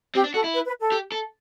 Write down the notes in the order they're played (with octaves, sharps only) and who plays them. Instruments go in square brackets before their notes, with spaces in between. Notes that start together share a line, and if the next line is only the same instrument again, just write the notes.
[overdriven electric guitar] C4 [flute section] G4
[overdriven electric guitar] D4
[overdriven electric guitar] F#4 [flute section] A4
[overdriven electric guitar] E4
[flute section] B4
B4
A4
[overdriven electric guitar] G4
A4